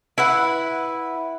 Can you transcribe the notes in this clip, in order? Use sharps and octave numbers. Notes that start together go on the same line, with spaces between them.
E4 B4 F#5